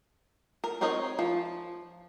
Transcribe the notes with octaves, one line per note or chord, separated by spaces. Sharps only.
A#4
C4 D#4 A#4 C#5 D#5
F3